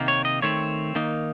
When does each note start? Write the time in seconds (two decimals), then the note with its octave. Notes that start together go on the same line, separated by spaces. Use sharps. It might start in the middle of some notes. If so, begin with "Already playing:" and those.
Already playing: C3 D#3 A#3
0.08 C#5
0.25 D#5
0.42 D#3 A3 C4 C#5
0.95 D#3 A#3 D#4